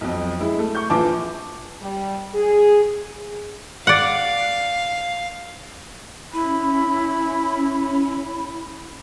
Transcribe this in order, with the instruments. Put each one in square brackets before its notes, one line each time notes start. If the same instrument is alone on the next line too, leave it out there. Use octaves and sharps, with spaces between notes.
[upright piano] B1 F2
G#3 E4
A3 A4
C#6 G6
A#1 E3 F4 A5 D6
[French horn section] G3
G#4
[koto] D5 F#5 [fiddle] F5
[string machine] C#4 [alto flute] E4 [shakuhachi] B5